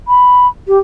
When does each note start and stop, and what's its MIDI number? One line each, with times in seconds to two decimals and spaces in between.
0.08 0.47 83
0.68 0.78 67